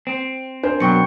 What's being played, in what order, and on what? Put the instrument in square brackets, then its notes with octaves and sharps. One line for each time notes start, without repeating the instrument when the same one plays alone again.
[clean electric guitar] C4
[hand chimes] D4 [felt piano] A#4 C5
[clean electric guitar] F#2 B2 F#3 [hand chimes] G5 C#6 C#7